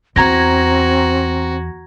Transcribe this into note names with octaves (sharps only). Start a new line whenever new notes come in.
E2 C4 F#4 A#5 G#6 A#6